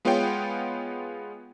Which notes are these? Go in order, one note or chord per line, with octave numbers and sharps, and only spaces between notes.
G#3 B3 F4 G#4 C#5 G5